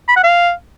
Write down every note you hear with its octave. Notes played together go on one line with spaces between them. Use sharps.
B5
F#5
F5